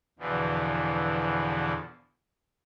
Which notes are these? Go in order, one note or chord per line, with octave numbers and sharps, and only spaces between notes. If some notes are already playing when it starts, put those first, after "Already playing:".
E2 B2 D3 E3 F3